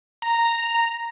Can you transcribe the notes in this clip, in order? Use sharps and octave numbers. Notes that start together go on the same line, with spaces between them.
A#5